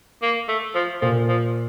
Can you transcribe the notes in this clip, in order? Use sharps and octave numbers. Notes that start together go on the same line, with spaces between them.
A#3
A3
F3
A#2 F3
F3